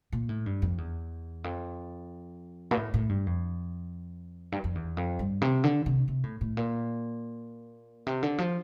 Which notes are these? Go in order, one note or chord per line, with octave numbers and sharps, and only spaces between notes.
A#2
A2
G2
F2
E2
F2
A#2
A2
A2
G2
F2
G2
F2
E2
F2
G2
C3
D3
C3
C3
A2
A2
A#2
C3
D3
F3